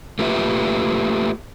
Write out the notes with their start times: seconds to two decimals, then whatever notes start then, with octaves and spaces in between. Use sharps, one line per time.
0.19 A3 A#3 F4 G4 B4 E5